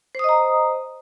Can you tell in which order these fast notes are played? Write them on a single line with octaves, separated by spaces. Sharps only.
C5 D#6 D#5 A#5